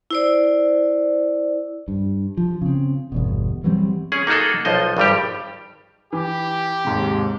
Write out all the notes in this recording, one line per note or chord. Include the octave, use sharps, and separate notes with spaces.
E4 C5 D5
G2
F3
C#3 C4
G1 E2 B2
E3 F#3 G3 C4
C#4 G#4
A#3 D#4 F#4 G#4 A4
B1 F3 C5 D#5
G#1 G2 G3 G4
E3 G4
D#2 G#2 C3